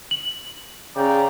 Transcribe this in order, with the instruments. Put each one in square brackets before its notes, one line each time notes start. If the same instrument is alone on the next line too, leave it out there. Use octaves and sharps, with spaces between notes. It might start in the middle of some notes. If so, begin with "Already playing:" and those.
[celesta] F#7
[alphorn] C#3 [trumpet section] D5 G5 A#5